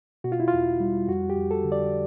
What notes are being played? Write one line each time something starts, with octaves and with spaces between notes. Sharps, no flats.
B2 F#4
F4
E4
E2 F4
G3
F2 F#4
G4
F2
A4
D3
D5